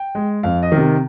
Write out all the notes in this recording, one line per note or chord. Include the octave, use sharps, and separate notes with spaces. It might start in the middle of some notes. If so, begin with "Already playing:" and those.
Already playing: G5
G#3
F2 F5
D#5
C3 D#3